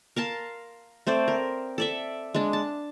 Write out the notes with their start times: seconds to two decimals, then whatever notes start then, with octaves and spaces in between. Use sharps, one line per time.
0.16 A#4 F5 A5 C6
1.07 A3 C4 C5 D5
1.28 A#4
1.78 A4 D5 E5
2.34 G#3 D4
2.53 A5